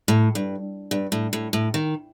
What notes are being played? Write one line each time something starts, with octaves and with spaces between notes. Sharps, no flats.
A2
G2
G2
A2
A2
A2
D#3